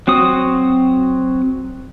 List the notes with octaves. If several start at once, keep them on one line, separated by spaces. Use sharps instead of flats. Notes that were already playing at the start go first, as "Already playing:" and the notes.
F#3 C4 F#4 D#6